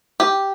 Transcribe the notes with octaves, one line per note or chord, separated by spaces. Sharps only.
G4